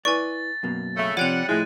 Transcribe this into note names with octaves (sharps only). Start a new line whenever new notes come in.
E4 B4 D5 G#5 C#6 A6
F#2 B2 A#3
C#3 A3
C3 F3 G3 C#5 F#5 G5 D#7 F7
A2 F3 G#3 E4 F#6 A6